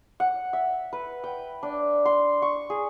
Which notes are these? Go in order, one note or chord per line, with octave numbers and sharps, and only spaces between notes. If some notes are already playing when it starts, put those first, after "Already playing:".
F#5
E5
B4
G5
D4
C6
C#6
G#4